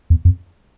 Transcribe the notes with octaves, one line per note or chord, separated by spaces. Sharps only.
E2
F2